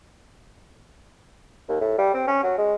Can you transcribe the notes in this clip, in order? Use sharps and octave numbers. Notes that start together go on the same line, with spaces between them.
D#2
A2
G3
C4
C#4
F#3
G#3